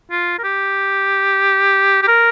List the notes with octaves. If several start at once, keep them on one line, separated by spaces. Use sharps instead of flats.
F4
A#4
G4
G4
A#4